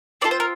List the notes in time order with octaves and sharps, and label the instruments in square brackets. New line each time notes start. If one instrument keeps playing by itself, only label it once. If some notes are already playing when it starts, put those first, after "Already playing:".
[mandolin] C4 F4 A4 D5
C5
A#4